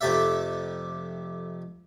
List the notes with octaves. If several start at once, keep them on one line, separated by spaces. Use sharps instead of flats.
F2 C3 A3 G4 D5 E5